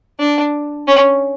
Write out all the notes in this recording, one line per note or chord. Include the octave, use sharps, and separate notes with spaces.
D4
C#4